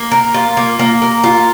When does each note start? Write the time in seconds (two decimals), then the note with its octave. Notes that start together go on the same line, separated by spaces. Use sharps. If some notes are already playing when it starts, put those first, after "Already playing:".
Already playing: A#3
0.12 A#4
0.34 F4
0.57 A#3
0.79 A#3
1.02 A#4
1.24 F4